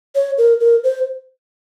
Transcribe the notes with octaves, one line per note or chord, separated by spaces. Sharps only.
C#5
A#4
A#4
C5